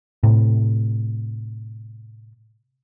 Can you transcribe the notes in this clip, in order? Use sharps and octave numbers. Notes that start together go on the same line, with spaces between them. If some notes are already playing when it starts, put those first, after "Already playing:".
A2 C3